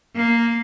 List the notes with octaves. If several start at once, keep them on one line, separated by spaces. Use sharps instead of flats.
A#3